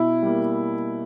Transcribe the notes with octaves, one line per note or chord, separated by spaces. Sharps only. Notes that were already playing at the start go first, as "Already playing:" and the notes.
Already playing: B2 E4
G3 A#3